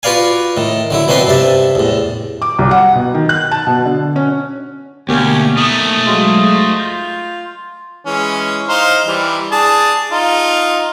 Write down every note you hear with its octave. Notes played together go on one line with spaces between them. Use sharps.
F4 F#4 B4 D5 F5 G#5
A2 D#3
D3 F#3 E4
B2 F#3 C4 D4 B4 C6
G2 C3 E5 A5
E2 A2
D6
C2
F#5
B2
D#3
F#6
A5
B2
D3
C#4
D2 B2 A#3 C#4 G4 C#5
A3 D#4 D#6
F#3 G#3 C5 D#5 F5
F4 G6
E3 G#3 C#4
D#4 C5 F5
E3 G3
D4 G#4 A5
D#4 F4